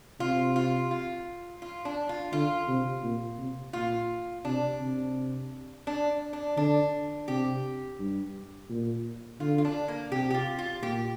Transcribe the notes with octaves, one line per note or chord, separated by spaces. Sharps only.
C3 F4
F4
F4
F4
D4
F4
D3 F4
C3
A#2
C3
A#2 F4
C3 D4
C3
D4
D4
D3 D4
C3 G4
G2
A#2
D3 F4
F4
D4
A#3
C3 G4
G4
F4
F4
A#2 G4